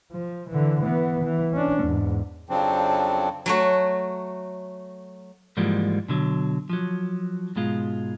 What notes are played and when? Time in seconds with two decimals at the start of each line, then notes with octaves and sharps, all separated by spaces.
0.12 F3
0.50 D3 E3
0.82 E3 B3
1.24 E3
1.53 C#4 D4
1.83 E2 G#2
2.49 F2 C#3 F3 F#3 C4 D4
3.46 F#3 A3 F#4
5.57 G#2 E3 F3 G3 G#3 A#3
6.09 B2 D3 F#3
6.70 F3 F#3
7.56 G#2 B2 G#3 F4